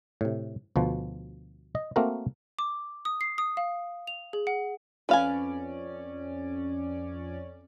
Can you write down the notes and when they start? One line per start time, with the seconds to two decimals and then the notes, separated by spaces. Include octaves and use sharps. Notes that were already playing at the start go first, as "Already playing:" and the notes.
0.21 A2 C3
0.76 D2 B2 F3
1.75 D#5
1.96 A3 A#3 C4 F#4 A#4
2.59 D6
3.05 D#6
3.21 C7
3.38 D#6
3.57 F5
4.07 F7
4.33 G#4
4.47 F#5
5.09 F2 C#4 B4 D5 F5 G#5